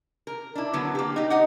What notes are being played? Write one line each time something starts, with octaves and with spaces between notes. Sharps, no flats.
A#4
D4 E4
D3 F#3 B3
A#3 G4
D#4 G4
D#4 D#5 F#5